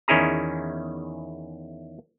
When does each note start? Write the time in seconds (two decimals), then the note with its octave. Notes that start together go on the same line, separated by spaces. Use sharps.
0.08 E2 D#3 C#4 E4 G#4 A#5